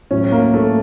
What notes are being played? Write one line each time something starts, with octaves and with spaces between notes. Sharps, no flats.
A2 F#3 C#4
A#3
A3